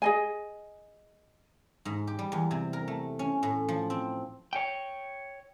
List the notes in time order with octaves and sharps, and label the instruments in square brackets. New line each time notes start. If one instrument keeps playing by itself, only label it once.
[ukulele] G#4 D#5 G#5
[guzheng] G#2
G4
G3
E2
C3
A#4
A3
C#4
A2
F3
C4
[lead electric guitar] C#5 G5